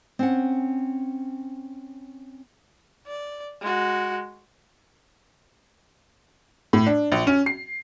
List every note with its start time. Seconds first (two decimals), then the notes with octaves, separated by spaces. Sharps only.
0.19 C4 C#4 F#5
3.07 D5
3.61 G#3 F#4
6.73 A2
6.87 D4
7.12 A#1
7.27 C#4
7.46 C7